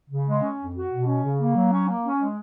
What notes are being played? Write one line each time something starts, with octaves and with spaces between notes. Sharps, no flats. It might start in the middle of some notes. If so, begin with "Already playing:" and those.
C#3
G#3
C#4
F2
F#4
B2
C#4
C#3
A#3
F#3
C#4
A#3
C#4
G#3